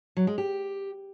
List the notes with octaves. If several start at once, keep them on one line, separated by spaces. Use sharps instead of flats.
F#3
G#3
G4